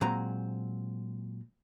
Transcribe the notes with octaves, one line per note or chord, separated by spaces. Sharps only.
A#2 F#3 G#3 C4 A#5